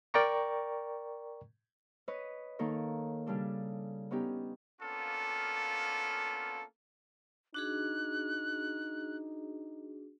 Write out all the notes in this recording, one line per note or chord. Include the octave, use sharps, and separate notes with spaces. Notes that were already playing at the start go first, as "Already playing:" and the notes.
A#4 D5 G5 A#5 C#6
B4 C#5 D#5
D#3 A#3 D#4 A4 A#4 C#5
C#3 G3 D4 A4
B3 C#4 D#4 G4
A#3 B3 C#4 D4 F4 A4
D4 D#4 F#4 G#4 F#6